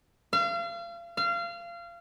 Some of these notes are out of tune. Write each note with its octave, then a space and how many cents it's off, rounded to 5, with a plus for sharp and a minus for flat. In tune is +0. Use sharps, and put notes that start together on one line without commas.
F5 -35
F5 -25